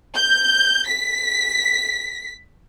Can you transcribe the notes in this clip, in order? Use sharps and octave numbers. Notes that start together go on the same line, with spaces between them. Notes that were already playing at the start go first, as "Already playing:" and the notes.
G6
B6